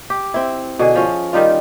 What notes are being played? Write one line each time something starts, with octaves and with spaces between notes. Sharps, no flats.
G4
C4 E4
B2 D3 G#4
F3 C#4
D#3 G3 D#4 F4